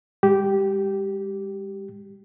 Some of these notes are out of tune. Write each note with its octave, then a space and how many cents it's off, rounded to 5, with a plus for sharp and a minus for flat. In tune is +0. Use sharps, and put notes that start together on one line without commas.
G#3 -45 G4 -10